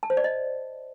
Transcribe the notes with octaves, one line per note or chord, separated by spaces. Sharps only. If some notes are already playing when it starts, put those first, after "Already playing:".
A5
C5
D5
D#5